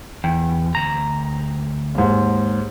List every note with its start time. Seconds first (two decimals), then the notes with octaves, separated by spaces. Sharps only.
0.24 E2 G5
0.75 D2 A#5
1.95 D#2 G#2